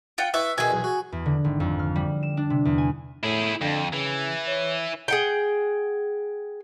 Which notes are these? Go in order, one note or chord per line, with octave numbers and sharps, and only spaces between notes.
F4 F#5 G5
E4 B4 E5 C#6
B2 D#3 G#4 E5 G#5
B1 E2
F#4
E2
D3
G#1
F2
F6
G3
E7
D4
C3
E2
G#5
A2 E4 G#4
F2 D3
C#3 E3
C#5
G#4 F#5 G5